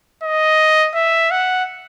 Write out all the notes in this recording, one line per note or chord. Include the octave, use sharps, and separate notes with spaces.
D#5
E5
F#5